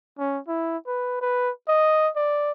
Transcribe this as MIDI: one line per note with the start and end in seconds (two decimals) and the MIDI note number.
0.19 0.39 61
0.48 0.77 64
0.87 1.21 71
1.21 1.50 71
1.68 2.09 75
2.16 2.52 74